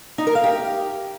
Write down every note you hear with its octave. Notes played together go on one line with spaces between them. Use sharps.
D#4
A#4
F5
G4